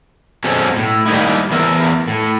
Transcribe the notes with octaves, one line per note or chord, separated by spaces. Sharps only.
B2 F#3 G#3 C4 C#4 A4
A2
G3 A#3 D#4 E4
E2 E3 B3 A#4 E5
A2